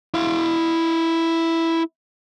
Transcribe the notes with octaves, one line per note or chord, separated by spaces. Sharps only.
E4 F5